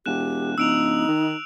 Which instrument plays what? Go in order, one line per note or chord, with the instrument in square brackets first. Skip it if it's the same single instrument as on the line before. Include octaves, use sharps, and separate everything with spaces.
[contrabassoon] E1 [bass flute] G4 [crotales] F#6 E7
[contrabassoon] D1 [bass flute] D#4 [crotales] E6 D7 F7
[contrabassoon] D#3